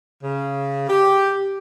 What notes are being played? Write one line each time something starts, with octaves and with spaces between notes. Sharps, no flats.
C#3
G4